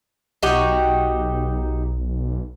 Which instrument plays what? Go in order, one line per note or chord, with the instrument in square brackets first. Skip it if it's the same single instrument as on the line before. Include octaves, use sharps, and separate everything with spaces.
[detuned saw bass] B1 [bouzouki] D#4 F#4 G4